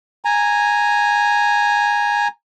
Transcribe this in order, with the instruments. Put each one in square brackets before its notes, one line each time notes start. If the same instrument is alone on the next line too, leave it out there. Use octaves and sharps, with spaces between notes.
[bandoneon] G#5 A#5